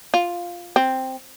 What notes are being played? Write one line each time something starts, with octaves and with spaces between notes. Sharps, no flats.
F4
C4